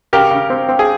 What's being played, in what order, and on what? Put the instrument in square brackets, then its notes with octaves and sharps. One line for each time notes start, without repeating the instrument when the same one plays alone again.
[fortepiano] C#3 G4 A#4
C#3
C4
C4
G#4